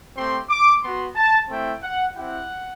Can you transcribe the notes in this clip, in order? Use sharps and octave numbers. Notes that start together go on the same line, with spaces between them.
A3 C4 G4 C6
D6
B3 F#4 C6
A5
A3 C4 E4 G5
F#5
C4 E4 G4 F#5